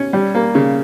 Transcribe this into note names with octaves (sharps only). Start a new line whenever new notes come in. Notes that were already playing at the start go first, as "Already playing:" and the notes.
Already playing: C#4
G3
A#3
C#3